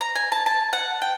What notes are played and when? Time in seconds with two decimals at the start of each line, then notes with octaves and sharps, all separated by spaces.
0.01 A#5
0.16 G#5
0.32 A5
0.46 A5
0.73 F#5
1.02 G5